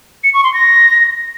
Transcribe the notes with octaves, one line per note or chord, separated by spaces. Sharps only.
C#7
C#6
C6
A#6